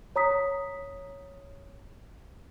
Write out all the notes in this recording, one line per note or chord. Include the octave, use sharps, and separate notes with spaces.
C#5 A#5 D#6 B6